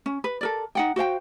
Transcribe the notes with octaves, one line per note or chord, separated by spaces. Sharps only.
C#4
B4
A4 A#4 D5
D#4 F#5 G5
F#4 C5 F5 G5